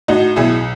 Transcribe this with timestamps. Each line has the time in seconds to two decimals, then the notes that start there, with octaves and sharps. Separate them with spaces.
0.08 A2 D#4 F#4
0.36 B1 E4 G#4